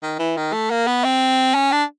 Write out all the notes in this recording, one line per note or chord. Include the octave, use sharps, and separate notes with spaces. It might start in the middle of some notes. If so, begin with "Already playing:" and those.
D#3
E3
D#3
A3
A#3
B3
C4
C#4
D4